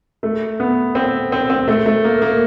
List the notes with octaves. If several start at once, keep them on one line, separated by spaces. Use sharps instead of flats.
A3
B3
C4
C4
C4
A3
A3
A#3
A#3